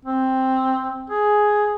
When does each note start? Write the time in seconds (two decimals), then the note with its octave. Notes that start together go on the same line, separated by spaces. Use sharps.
0.05 C4
1.10 G#4